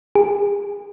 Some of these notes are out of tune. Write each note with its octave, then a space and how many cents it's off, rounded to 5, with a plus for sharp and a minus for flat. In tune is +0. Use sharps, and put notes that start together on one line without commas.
G#4 -40